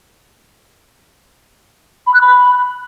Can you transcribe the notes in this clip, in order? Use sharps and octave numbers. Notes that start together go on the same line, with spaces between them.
B5
F#6
B5